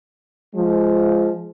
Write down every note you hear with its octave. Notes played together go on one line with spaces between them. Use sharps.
F3 G#3